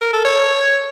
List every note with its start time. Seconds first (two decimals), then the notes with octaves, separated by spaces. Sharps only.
0.01 A#4
0.13 A4
0.25 C#5